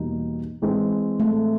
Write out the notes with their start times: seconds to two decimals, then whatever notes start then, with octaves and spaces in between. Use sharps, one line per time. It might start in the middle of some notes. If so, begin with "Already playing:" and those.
Already playing: E2 B2 G3 A#3 D#4
0.62 E3 G#3 C4
1.20 A3